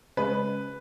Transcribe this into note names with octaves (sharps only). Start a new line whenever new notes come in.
C#3 G#3 C#4 B4